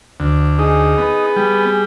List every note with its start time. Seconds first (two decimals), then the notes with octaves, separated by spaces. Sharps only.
0.20 D2
0.59 D#4 G#4
0.98 B3
1.36 G3